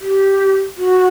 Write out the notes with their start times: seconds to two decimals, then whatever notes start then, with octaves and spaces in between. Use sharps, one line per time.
0.01 G4
0.78 F#4